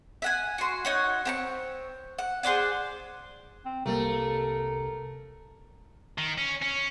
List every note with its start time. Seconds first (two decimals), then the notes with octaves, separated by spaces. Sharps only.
0.22 E5 F#5 G#5
0.58 F#4 C6
0.85 D#4 C#5 F#5
1.25 C4 A#5 C#6
2.19 F#5
2.43 G#4 C5 D5 F#5
3.65 C4
3.86 C2 G3 A3 A#3 A#4
6.18 D#3
6.38 C#4
6.62 C#4